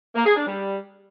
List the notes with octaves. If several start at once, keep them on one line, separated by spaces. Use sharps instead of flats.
A#3
G#4
D4
G3